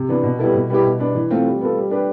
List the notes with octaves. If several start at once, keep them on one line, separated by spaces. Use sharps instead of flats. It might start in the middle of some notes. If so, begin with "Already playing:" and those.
Already playing: C3
E3 B3 D4
B2
G3 B3 E4 A4
B2
G3 B3 E4 G4
B2
B3 D4
E3
A3 C4 F4
G3
B3 F4 A4
G3
D4 G4 B4